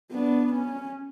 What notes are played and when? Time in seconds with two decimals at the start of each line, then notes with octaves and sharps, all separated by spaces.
0.11 B3 D4
0.52 C#4